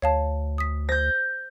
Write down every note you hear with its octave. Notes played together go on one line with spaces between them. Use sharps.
D2 C#5 F5 A5
D#6 B6
C5 G6 A#6